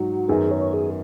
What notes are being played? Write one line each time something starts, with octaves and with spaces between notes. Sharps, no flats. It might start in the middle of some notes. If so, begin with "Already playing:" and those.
Already playing: G#2 F#3 D#4 F#4
F#2 D#3 B3 G#4
C#5
G#4